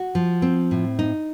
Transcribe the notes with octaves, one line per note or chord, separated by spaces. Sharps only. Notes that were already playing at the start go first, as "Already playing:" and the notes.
Already playing: F#4
F3
C4
A2
D#4